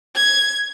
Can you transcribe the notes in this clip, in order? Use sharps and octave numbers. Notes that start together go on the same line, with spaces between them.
G#6